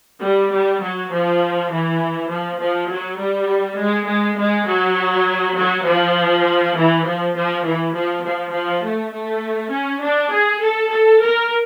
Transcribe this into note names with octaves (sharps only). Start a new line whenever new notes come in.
G3
G3
F#3
F3
E3
F3
F3
F#3
G3
G#3
G#3
G#3
F#3
F#3
F3
E3
F3
F3
E3
F3
F3
F3
A3
A3
C#4
D4
G#4
A4
A4
A#4